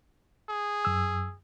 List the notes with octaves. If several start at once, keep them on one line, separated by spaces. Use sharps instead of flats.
G#4
F#2 E6